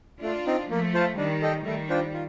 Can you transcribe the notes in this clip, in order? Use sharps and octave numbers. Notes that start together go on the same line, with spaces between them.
A3 D4 F4
C4 D#4
F3 A3 A#3
F4 C5 F5 A5
D#3 G3 D4
A4 D#5 G5
D#3 G3 A3
D4 F4 C5 G5
F4